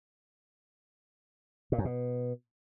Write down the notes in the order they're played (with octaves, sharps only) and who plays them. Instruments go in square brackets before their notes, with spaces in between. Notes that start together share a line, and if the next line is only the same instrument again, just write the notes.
[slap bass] A#2
F#2
B2